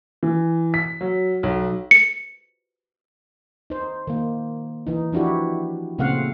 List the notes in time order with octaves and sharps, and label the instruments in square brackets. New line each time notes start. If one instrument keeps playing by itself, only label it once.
[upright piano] E3
B6
F#3
B1
[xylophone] C#7
[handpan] D#4 C5
D#3 A#3
E3 D#4
F3 D4 E4 F#4 G4
A#2 C#3 A3 C4 F5 F#5